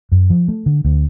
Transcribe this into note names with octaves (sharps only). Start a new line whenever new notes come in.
F#2
F3
A3
D3
D2